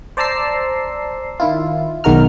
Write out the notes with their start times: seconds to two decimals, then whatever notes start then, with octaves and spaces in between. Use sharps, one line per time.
0.17 C5 D5 A5 A#5 E6 C7
1.40 D#3 E4 F4
2.04 B1 D#3 G#3 F#4 A#4 F6